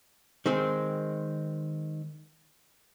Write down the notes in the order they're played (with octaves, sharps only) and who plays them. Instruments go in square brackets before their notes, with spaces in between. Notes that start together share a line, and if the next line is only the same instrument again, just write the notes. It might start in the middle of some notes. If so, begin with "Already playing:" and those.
[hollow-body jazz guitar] D#3 G#3 C4